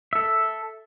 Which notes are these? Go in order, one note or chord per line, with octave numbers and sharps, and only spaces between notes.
A4 E5